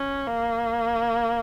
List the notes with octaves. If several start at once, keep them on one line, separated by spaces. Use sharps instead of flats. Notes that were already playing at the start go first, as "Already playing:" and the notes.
Already playing: C#4
A#3